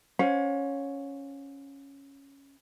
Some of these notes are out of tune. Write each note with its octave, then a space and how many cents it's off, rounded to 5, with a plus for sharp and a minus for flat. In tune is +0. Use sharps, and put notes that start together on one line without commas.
C#4 +0 C5 +0 F5 +45